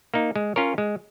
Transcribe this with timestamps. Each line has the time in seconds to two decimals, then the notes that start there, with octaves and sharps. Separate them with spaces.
0.14 A#3 D#4
0.36 G#3
0.56 C#4 F4 A#4 C#5
0.78 G#3